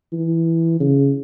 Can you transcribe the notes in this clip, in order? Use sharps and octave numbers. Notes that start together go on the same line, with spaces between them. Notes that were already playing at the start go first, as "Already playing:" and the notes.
E3
C#3